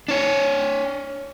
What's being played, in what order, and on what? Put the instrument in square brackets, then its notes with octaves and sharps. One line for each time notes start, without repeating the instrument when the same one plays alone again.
[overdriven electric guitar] D4 C#5